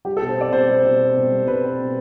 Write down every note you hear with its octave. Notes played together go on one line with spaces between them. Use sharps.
G3 G4
A4
B2
C5
C4 D5
B2 C5
G3
B2
C4
B2
G3
B2 B4
C4
B2